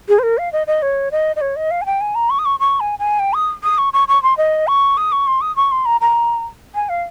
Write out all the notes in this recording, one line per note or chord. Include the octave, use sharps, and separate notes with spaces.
G#4
C5
A#4
F5
D#5
D#5
C#5
D#5
D#5
C#5
D#5
F5
G#5
G5
G#5
A#5
C#6
D#6
C#6
C#6
G#5
G#5
G5
D#6
D#6
C#6
C#6
C#6
C6
D#5
C#6
D#6
C#6
C6
D#6
C#6
C6
A#5
A#5
G#5
F5